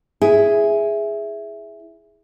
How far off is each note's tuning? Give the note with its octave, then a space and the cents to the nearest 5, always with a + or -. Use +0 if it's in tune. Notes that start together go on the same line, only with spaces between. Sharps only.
E4 +0 G#4 +0